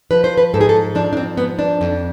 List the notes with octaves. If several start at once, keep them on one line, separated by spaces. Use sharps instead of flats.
F3 B4
C5
B4
G#2 A4
G#4
A4
F3 D4
D4
C4
G#2 B3
D4
F2